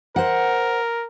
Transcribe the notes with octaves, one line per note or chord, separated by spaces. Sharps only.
A#4 C5 F#5